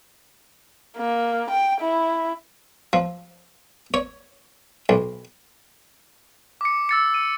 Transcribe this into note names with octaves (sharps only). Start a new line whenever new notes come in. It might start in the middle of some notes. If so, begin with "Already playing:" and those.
A#3
G5
E4
F3
C#5
B1
D6 C#7
E6 A6 C#7
D#7